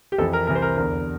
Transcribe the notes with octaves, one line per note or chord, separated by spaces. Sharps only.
G4
F2 E3 A4
A#4
C2 C3 E3 A#4
C5
A#4
E2 D3 A#4